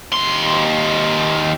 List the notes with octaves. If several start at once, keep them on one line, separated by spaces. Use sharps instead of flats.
D#2 C6